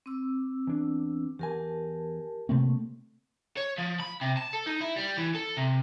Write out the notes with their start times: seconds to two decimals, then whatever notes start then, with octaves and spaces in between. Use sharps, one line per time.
0.06 C4 D6 E6
0.67 E2 D4
1.39 E2 G4 A#4 G#5 A5
2.49 A2 C3 A3 A#3 C4
3.57 C#5
3.78 F3
4.00 B5
4.21 C3
4.37 A5
4.54 A4
4.67 D#4
4.81 E4
4.97 G3
5.18 E3
5.35 A4
5.57 C3